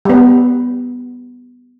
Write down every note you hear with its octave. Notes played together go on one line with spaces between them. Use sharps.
G3 B3